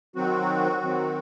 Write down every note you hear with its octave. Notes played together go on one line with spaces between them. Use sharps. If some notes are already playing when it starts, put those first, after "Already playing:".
D#3 F#3 C4 F#4
D#3 F#3 C4